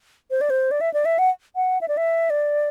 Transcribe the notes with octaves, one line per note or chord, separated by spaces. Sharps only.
C5
D5
C5
D5
E5
D5
E5
F#5
F#5
E5
D5
E5
D5